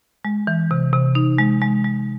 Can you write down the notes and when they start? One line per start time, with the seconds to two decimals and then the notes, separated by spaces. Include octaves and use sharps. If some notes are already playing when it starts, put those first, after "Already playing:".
0.25 G#3
0.47 E3
0.71 C3
0.93 C3
1.15 D#4
1.39 G#3
1.61 G#3
1.84 G#3